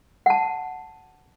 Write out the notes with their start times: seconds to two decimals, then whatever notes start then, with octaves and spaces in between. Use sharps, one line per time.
0.26 F#5 A5